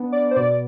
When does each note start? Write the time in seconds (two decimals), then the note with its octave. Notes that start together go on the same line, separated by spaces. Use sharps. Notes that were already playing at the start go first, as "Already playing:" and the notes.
Already playing: B3 D4
0.12 D5
0.31 C5
0.36 B2 D5